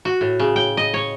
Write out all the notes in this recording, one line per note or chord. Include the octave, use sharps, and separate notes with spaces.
F#4
A2
C#3
G5
D#5
C#5